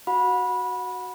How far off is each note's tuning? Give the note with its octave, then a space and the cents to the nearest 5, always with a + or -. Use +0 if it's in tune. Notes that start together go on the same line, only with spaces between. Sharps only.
F#4 +0 F#5 -30 B5 -15